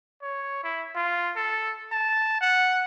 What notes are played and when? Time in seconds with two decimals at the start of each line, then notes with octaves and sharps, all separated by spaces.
0.23 C#5
0.64 E4
0.96 F4
1.36 A4
1.92 A5
2.41 F#5